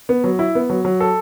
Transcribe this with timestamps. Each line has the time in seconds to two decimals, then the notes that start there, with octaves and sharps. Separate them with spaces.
0.09 B3
0.24 F#3
0.39 E4
0.55 B3
0.70 F#3
0.85 F#3
1.00 A4